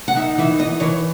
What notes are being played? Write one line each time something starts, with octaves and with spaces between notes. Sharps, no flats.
F#5
D#4 E5
E3 E5
E3 D#5
E3 C#5